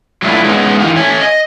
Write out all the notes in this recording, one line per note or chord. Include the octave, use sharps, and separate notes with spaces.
F#3 G3 A3 D4 E4 F4
F#3 G#3 B3 C#4 D#4
D#3 E3 G4 F5
A3 C#5 G#5
D#5